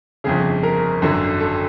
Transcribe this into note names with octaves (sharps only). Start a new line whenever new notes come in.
G1 F2 C#3 G#4
A#4
G#1 F#2 D3 F#3
A4